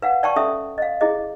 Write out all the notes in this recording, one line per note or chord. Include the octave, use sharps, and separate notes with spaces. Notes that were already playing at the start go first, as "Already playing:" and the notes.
B4 F5 F#5
D5 G5 A5 C#6
C#4 A4 E5 D#6
D#5 F5
E4 G#4 D#5